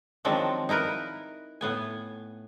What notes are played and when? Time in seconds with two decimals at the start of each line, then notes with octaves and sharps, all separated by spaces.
0.25 D#3 F3 F#3 G#3 C4 D4
0.69 D#4 E4 A#4 B4
1.61 A2 B3 G#5